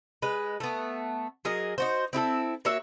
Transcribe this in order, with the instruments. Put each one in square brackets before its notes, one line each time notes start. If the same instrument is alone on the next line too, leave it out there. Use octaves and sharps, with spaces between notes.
[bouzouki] G#3 B4
A3 B3
F#3 G#4 A#4 D#5
D#4 F#4 C5
C4 E4 G#4 A4
A#3 F#4 C#5 E5